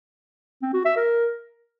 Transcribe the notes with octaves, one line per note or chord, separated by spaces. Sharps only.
C4
F#4
E5
A#4